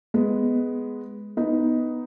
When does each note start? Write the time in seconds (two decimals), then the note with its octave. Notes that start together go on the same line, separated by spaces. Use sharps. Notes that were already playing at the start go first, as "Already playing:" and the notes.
0.14 G#3 B3
1.37 B3 D#4